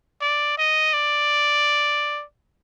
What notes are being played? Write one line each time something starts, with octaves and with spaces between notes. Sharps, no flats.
D5
D#5
D5